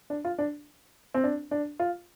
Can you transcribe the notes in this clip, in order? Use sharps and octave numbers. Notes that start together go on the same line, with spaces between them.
D4
F4
D4
C4
D4
D4
F4